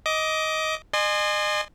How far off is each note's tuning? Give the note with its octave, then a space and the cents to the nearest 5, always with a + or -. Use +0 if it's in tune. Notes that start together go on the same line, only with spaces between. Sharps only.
D#5 +15 D6 +0
D#5 -40 G#5 +0 C6 +0